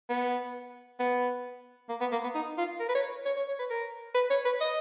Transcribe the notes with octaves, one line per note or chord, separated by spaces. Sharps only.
B3
B3
A#3
B3
A#3
B3
D#4
F4
A#4
B4
C#5
C#5
C#5
C#5
B4
A#4
B4
C#5
B4
D#5